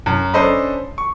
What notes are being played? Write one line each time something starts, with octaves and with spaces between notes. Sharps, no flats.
F#2
C#4 D4 A4 C5 D#5 B5
C#6